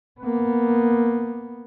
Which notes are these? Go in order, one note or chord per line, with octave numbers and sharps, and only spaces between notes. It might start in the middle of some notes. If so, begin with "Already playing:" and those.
A#3 B3